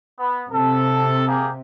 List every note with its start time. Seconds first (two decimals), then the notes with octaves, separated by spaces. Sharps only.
0.19 B3
0.52 C3 A4
1.28 A#3 G4 G#4